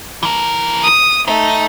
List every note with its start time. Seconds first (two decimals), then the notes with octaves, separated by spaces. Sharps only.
0.23 E3 A#4
0.83 D#6
1.28 A3 D#4